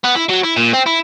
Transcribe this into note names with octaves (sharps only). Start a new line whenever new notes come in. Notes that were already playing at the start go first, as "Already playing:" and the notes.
B3
E4
F#3
E4
A#2
C4
E4